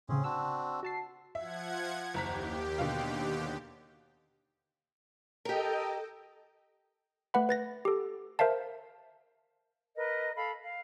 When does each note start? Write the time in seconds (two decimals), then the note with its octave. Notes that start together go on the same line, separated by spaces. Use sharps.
0.09 A2 C#3 C4 C#4 G#4
0.24 C4 D4 F#4 E6
0.83 F#4 A5 C7
1.35 F3 E5 F#5 G#6
2.14 F#1 D#2 G4 A#5 B6
2.78 B2 D3 F5
5.45 G4 A4 A#4 D#5 G5
7.34 A3 B4 F#5 B5
7.49 B4 A6 A#6
7.85 G4 A4
8.39 A#4 C5 E5 F5 A5
9.94 A#4 B4 D#5
10.36 A4 F5 B5
10.61 F5